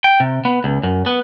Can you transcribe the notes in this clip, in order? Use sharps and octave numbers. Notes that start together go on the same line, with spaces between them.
G5
C3
B3
C#2
F#2
B3